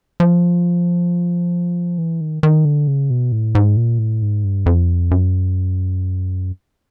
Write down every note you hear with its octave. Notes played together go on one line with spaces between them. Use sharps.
F3
E3
D#3
D#3
D3
C#3
B2
A2
G#2
A#2
A2
G#2
G2
F2
F#2